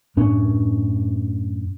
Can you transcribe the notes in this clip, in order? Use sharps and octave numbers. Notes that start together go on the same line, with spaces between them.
F#2 A2 C#4 D4